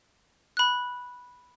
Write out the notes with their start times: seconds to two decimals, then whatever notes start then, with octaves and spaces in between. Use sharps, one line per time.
0.57 B5 F#6